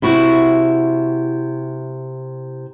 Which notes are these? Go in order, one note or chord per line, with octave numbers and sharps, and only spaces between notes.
C3 E4 F#4